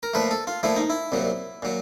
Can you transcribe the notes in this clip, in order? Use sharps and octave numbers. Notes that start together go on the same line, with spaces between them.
A#4
A#2 F3 A3 B4
A4
F4
A#2 F3 A3 E4
D#4
E4
C2 A#2 F#3
A#2 F#3